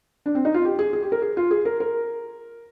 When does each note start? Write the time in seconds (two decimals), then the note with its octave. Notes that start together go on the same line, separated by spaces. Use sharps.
0.26 D4
0.35 C4
0.45 D#4
0.54 F4
0.65 G4
0.79 G#4
0.93 G#4
1.03 G4
1.12 A#4
1.22 G#4
1.37 F4
1.51 G#4
1.65 A#4
1.80 A#4